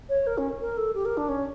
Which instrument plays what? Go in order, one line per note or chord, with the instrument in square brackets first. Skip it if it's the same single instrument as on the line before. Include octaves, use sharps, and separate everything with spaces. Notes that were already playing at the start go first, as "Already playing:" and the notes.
[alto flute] C#5
A#4
C#4
A#4
A4
G4
A#4
D4
C#4